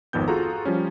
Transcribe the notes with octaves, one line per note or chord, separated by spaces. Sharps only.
G#1 F2 D#3 B3 G6
F4 F#4 G#4 A4 A#5
F3 G3 C#4